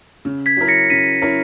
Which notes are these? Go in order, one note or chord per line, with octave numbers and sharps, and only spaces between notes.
C#3
G#6 B6
F#3 C#4 E4 A#4
A#6 C#7
C#3 B6 D#7
F#3 C#4 E4 A#4